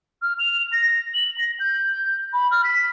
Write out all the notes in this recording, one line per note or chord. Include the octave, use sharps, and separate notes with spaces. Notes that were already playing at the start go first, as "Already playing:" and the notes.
F6
F7
A#6
F#7
A#6
G6
B5
F6
B6